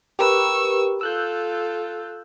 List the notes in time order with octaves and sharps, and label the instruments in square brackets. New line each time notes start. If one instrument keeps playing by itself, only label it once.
[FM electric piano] G4 A#4 B4 [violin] C#6 E6
[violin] F4 A4 [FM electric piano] E6 F#6 G6